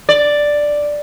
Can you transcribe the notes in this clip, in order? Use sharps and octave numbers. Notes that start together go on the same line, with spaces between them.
D5